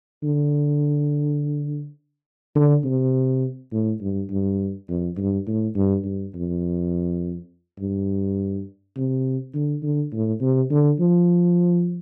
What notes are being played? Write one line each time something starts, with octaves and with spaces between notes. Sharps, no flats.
D3
D3
C3
A2
G2
G2
F2
G2
A2
G2
G2
F2
G2
C3
D3
D3
A2
C3
D3
F3